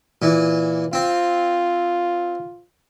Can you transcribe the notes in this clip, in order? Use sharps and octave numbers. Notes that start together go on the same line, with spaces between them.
A#2 E3
C4 F4